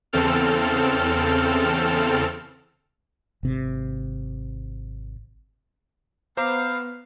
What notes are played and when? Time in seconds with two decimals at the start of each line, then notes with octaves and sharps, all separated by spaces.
0.13 E2 C#3 C4 A4 F6
3.43 G#1 C3
6.37 B3 C5 F5 A#5 D6